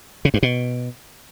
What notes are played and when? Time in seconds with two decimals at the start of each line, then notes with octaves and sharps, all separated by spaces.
0.25 C#3
0.34 G2
0.43 B2